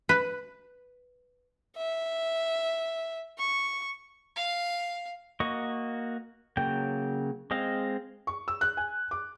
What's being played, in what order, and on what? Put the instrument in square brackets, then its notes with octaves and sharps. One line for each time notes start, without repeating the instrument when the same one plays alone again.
[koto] B4
[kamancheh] E5
C#6
[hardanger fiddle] F5
[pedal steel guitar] A#3 F#4 D#5 C#6
C#3 F#3 A#3 G5
G#3 C4 D#5 F5
[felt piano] C#6
E6
F#6
G#5
D6